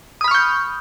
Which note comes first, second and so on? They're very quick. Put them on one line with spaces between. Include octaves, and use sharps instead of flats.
D#6 B5 F6 C#6 G6